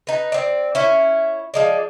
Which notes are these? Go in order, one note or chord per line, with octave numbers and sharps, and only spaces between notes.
D#4 B4
C4 D5
C#4 E4
F3 G#3 D5